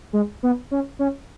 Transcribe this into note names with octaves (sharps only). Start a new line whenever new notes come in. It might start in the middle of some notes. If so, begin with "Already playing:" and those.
G#3
B3
C#4
C#4